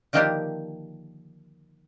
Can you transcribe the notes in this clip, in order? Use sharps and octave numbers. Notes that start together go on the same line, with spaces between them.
D3 D#3 F3 A#3 D4 G4